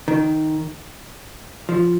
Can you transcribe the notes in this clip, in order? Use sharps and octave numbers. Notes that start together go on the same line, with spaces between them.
D#3
F3